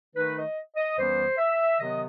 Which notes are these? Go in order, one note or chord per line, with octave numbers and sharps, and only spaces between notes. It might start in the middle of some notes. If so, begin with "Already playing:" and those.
D#3 A3 D#4 B4
D#5
D#5
F#2 E3 G3 B3 C5
E5
C3 D#3 F#3 B3 D#5